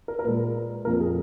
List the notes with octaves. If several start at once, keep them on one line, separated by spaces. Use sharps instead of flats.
A#4
A#4
A#2 G#3 B4
F2 F3 A#3 A#4
G#4